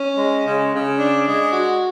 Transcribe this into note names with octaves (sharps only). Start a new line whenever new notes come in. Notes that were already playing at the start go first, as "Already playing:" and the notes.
Already playing: C#4
G#3
C#3
C#3
D4
G#3
F#4